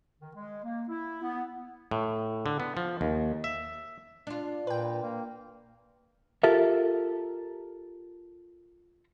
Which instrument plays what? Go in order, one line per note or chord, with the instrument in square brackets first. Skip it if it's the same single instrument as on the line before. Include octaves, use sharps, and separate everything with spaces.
[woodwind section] D#3
G#3
A#3
E4
B3
[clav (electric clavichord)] A2
D3
B3
F3
D#2
E5
[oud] D4 F4
[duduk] A#2 [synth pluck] B4 G5
[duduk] A#3
[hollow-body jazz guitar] F4 G4 A4 A#4 E5